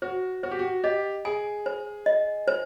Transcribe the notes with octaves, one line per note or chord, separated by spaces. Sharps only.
F#4 C5
F#4 C5
G4
F#4
G4 D#5
G#4 G#5
C5
D#5
C5